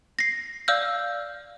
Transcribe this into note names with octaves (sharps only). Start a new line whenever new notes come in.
A#6 C7
D5 F5 E6 F6 G6